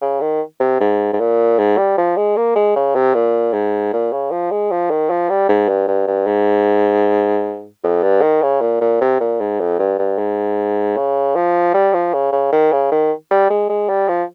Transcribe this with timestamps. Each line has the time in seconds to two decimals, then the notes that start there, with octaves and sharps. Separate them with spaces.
0.01 C#3
0.21 D#3
0.60 C3
0.80 G#2
1.13 G#2
1.20 A#2
1.59 G#2
1.77 G3
1.98 F3
2.17 G#3
2.37 A#3
2.55 G#3
2.76 C#3
2.95 C3
3.14 A#2
3.53 G#2
3.93 A#2
4.12 C#3
4.31 F3
4.51 G#3
4.71 F3
4.90 D#3
5.10 F3
5.29 G3
5.49 G#2
5.68 G2
5.88 G2
6.07 G2
6.27 G#2
7.84 F2
8.03 G2
8.22 D#3
8.42 C#3
8.61 A#2
8.81 A#2
9.01 C3
9.21 A#2
9.40 G#2
9.60 F2
9.79 G2
9.99 G2
10.18 G#2
10.97 C#3
11.35 F3
11.74 G3
11.93 F3
12.14 C#3
12.32 C#3
12.52 D#3
12.72 C#3
12.92 D#3
13.31 G3
13.50 G#3
13.69 G#3
13.89 G3
14.08 F3